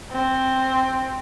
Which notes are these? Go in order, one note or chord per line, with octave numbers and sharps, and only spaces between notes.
C4